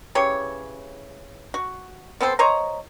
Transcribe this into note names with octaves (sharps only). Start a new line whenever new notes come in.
C#3 E3 G4 C#5
F#4
B3 C4 A4 C5
C5 C#5 D#5 A#5